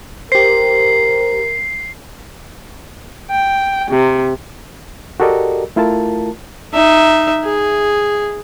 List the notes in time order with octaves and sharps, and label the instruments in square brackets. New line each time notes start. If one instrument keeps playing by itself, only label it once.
[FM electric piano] G4 C5 [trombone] A#4 [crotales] C7
[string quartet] G5
C3
[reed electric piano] F#4 G4 A4 A#4 D5 D#5
A3 E4 F4 A#4 A5
[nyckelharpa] D#4 E5
G#4